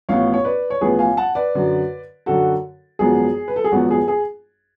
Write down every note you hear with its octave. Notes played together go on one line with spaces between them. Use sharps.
A1 A2 F3 B3 C#5 F5
C#5
B4 D5
C#5
A1 A2 F3 B3 G#4 B4
F5 G#5
F#5 A5
B4 D5
F#2 D3 F#3
F#2 D3 F#3 F#4 A4
G#1 F#2 F3 B3 G#4
B4
A4
G#4
G#1 F#2 F3 B3 F#4
G#4
G#4